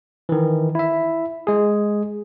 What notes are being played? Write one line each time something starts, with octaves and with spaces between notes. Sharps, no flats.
D#3 E3
E4 E5
G#3 G#4